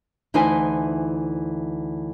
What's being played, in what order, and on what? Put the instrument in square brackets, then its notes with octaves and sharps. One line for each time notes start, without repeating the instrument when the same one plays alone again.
[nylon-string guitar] D2 E3 D#4 E4 C5 G#5